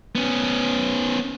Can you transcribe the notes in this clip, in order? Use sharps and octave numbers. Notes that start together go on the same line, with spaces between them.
B3 C#4